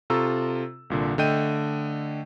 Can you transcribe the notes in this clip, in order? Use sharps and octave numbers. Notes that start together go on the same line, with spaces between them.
C3 F4 A4 A#5 C#6 E6
C2 A#2 D3
D3 A3 D#5 G5 G6 D#7